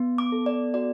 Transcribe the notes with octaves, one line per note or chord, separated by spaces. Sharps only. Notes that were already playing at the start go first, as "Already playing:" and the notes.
Already playing: B3
D6
A4
D5
F#4 D5